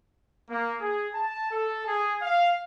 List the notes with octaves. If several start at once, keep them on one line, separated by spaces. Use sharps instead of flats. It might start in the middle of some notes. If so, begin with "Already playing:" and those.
A#3
G#4
A5
A4
G#4
F5